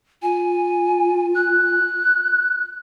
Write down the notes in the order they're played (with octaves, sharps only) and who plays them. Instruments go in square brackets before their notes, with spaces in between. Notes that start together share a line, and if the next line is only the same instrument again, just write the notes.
[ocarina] F4 [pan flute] G#5
[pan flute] F#6